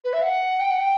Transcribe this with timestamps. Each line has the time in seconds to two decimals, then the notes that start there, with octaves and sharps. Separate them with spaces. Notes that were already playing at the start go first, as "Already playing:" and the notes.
0.04 B4
0.13 E5
0.22 F#5
0.59 G5
0.70 F#5
0.79 G5